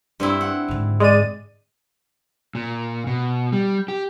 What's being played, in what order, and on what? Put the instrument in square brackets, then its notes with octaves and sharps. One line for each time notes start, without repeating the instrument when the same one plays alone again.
[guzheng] G2 C4 E4
F#5
[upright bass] G#2 D3
[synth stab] G#3 D#7 [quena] D5
[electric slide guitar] A#2
B2
G3
G4